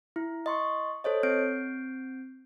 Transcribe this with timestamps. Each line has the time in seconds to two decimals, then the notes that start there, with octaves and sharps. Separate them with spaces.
0.16 E4
0.46 D#5 C6 C#6
1.04 A4 C5 C#5 D#5
1.23 C4 G6 C7 D7